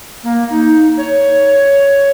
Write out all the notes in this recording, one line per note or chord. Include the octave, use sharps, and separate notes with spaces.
A#3
D#4
C#5